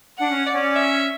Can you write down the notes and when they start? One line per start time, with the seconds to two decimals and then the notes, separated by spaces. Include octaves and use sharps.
0.18 D4 F#5
0.30 C#4
0.47 D5
0.53 C#4
0.76 E5